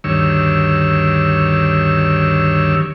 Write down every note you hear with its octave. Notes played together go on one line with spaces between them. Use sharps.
D2 G2 D#3 C#5 E6